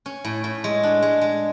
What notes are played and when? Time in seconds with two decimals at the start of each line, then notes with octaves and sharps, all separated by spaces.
0.06 C#4
0.25 A2
0.44 A2
0.64 G#3
0.83 D4
1.02 G#3
1.21 G#3